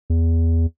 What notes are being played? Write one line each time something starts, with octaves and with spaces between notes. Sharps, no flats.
E2